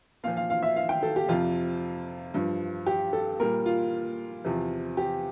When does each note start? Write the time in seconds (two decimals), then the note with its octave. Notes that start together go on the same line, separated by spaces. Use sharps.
0.24 A#2 F5
0.28 F3
0.37 F5
0.50 F5
0.62 E5
0.76 F5
0.89 G5
1.03 A4
1.16 G4
1.29 F2 C3 F3 F4
2.34 G2 F3
2.86 G4
3.13 A4
3.40 A#2 G3 A#4
3.66 F4
4.45 E2 C3 F3
4.97 G4